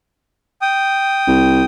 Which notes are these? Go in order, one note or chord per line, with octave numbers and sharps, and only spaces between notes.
G5 D#6
C2